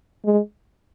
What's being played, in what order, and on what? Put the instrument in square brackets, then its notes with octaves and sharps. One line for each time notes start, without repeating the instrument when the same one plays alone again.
[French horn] G#3